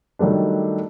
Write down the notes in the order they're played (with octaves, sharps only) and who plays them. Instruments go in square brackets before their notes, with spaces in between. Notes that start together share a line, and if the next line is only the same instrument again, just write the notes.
[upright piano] D#3 F#3 G3 A3 D4